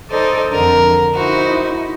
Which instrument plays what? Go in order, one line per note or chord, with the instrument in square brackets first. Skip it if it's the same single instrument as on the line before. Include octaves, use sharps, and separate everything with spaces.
[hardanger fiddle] D#4 C5 [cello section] A4 D5 D#5
[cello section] F2 D3 [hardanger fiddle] A#4
[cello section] D#4 E4 [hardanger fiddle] F#4 C5